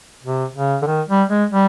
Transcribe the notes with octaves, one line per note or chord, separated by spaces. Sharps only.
C3
C#3
D3
D#3
G3
G#3
G3